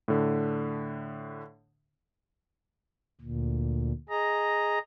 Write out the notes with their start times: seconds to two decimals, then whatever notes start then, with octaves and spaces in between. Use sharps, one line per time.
0.08 A2 D3
3.21 D2 A#2
4.09 G#4 D#5 A#5